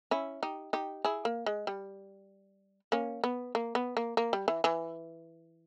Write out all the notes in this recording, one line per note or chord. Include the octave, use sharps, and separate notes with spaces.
C#4 E4
D#4 G4
D#4 G4
E4 G#4
A#3
G#3
G3
A#3 C#4
B3
A#3
B3
A#3
A#3
G3
E3
E3